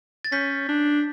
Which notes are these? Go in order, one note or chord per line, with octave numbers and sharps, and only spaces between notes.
A6
C#4 G6 B6
D4